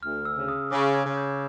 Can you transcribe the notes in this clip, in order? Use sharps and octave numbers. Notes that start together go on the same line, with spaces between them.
D2 F6
E6
C#3
D#6
C#3 D6
G#6
C#3
G6